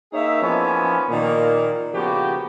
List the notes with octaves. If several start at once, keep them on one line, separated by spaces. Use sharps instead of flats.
A#3 D#4 G#4 C#5 E5
E3 F3 A#3 B3 C#4
A#2 D#3 A#3
C#3 F3 A#3 B3 F#4 G4